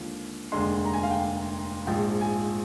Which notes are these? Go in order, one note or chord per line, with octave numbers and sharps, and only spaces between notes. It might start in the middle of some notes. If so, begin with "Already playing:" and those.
Already playing: D#2 D3 F3 G#3
F1 D#2 D3 G#3 C6
A#5
G#5
F5
G5
A#1 G#2 F3 G#3 G5
G#5